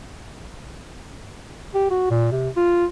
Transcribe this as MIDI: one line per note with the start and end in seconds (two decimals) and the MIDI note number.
1.75 1.87 67
1.90 2.08 66
2.11 2.30 46
2.31 2.49 48
2.57 2.85 65